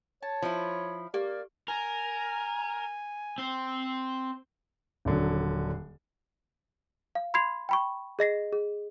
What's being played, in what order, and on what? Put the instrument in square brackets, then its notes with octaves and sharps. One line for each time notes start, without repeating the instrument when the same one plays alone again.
[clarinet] C#5 [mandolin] A5
[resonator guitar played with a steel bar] F3 E4
[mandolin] A#3 [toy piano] G4 [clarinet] D5
[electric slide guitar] A#4 [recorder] G#5
[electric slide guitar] C4 C5
[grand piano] D#1 D3 F#3
[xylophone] F5
B5 C6 G#6 C7 F7
G5 B5 C#6
G#4 D#5 A#6 C7
G#4